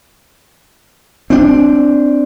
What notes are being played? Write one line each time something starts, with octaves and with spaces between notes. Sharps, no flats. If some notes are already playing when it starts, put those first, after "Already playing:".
C4 D4